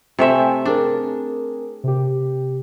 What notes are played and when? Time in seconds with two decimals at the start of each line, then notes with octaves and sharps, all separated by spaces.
0.19 C3 A3 E5 G5 G#5 C6
0.66 C4 D4 G#4 A#4
1.84 C3 G4